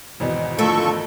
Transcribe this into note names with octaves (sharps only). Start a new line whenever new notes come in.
G#1 E2 B2 D#5
D3 F3 A3 F4 A4 A#4 C#6